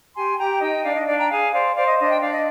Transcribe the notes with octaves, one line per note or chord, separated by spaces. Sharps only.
G4 G#5 C6
G4 G5 A#5
D#4 D#5 G5
D4 D5 F5
D#5
D4 D5 F5
G5 A#5
G#4 F5 G#5
C5 D5 F5
C5 D5 F5
D#5
D4 D#5
G5
D4 F5
D#5